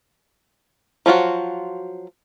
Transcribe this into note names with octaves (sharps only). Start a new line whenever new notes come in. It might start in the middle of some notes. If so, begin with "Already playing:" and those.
F3 F#3 F4 F#4